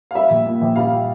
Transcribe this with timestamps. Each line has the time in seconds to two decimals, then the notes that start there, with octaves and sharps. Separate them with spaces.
0.11 F5
0.15 G3 E5
0.30 A#1
0.46 A#2
0.61 A#1
0.76 G3 F5